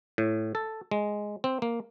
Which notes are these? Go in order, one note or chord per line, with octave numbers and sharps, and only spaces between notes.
A2
A4
G#3
C4
A#3